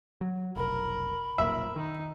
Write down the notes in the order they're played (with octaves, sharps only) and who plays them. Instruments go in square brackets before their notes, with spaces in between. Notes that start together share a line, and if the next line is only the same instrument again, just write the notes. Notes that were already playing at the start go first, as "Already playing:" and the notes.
[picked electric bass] F#3
[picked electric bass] F1 B1 [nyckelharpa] A#4 [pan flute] B5
[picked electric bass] F1 B1 A#2 [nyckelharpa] A#4 [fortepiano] E5
[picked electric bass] D#3 [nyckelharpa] D#4